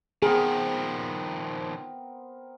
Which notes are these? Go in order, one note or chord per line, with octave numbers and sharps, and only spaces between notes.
D#3 F3 B3 C4 G#4 A#4